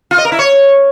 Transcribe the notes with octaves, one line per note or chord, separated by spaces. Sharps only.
F4
D#5
A#4
E4
C#5